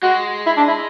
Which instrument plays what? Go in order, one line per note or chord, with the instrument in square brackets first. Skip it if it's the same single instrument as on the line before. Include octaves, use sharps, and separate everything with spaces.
[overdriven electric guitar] G#3 [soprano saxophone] F#4
[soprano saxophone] E4
D4
E4